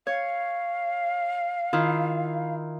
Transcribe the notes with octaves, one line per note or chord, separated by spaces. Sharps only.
C#5 F5
D#3 E4 F4